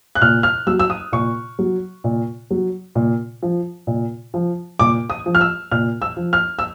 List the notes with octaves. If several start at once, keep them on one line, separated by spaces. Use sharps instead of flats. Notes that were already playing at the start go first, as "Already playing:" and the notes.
F#6
A#2 F6
F6
F#3 E6
E6
D#6
A#2 C#6
F#3
A#2
F#3
A#2
F3
A#2
F3
A#2 D6
D#6
F3
F6
E6
A#2 F6
E6
F3
F6
E6